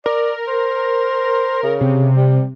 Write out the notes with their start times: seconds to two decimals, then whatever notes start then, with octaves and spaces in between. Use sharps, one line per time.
0.06 A#4 D5
0.47 C5
1.63 C#3
1.81 C3
2.16 G3